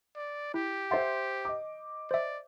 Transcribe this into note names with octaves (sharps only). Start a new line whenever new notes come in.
D5
E4 G4
C5 E5 F#5 C6 A6
D#5 D6
C5 D5 E5